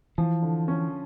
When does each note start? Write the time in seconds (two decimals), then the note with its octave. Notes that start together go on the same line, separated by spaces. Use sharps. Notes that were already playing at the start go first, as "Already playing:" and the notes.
0.18 E3 F3
0.42 D3
0.68 C#4